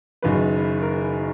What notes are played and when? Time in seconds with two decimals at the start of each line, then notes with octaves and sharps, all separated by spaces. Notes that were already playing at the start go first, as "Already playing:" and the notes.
0.22 F#1 F#2 D#3 B4
0.82 A#4